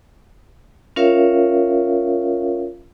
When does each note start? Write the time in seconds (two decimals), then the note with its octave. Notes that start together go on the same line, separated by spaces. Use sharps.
0.96 C#4 F4 A#4 C#5 E5 F5